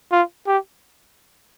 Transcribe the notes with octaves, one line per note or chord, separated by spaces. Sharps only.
F4
G4